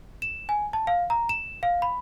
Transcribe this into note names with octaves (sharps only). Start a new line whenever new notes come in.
E7
G#5
A5
F5
A#5
E7
F5
B5